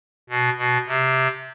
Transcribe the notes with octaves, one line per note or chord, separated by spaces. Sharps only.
B2
B2
C3